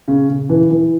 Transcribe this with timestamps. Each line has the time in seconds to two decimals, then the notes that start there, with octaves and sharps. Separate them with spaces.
0.08 C#3
0.29 C#3
0.49 E3
0.71 E3